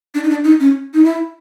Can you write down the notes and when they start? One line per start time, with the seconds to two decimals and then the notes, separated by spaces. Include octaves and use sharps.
0.15 D4
0.24 D#4
0.30 D4
0.44 D#4
0.60 C#4
0.94 D#4
1.04 E4